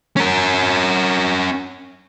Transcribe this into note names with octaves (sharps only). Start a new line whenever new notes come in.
C#4 A#4